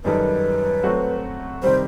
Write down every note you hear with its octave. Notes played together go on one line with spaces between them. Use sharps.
F#2 D#3 G3 D#4 A4 B4
F#3 A3 C4 F#4
C3 D#3 G3 C5